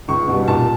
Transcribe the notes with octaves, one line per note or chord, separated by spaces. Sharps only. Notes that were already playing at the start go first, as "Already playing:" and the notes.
C#2 C#6
B2
G3
A#2 A5